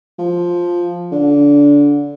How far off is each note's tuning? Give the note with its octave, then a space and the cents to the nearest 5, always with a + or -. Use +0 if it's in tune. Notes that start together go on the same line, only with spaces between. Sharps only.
F3 +5
D3 -20